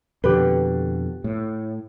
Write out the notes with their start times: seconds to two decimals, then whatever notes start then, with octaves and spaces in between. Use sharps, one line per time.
0.24 F2 B2 D3 G4 B4
1.24 A2